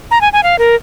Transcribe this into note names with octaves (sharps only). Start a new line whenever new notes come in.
A#5
G#5
G#5
F5
A#4